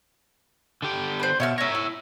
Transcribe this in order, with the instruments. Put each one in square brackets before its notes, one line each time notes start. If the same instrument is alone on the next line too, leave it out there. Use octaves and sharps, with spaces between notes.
[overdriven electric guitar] D3 G4
[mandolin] B4 C5
[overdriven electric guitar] B2 [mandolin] C#5 E5 F6
[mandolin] C#4 A#5 [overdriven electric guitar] C#5 E5
[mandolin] E4